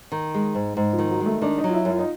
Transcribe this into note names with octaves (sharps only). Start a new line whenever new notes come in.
D#3
G#3
G#2
G#2
F3
D#3
F#3
G#3
A3
D#3 D4
D#4
F#3
F4
E4
F#2
F4
D#4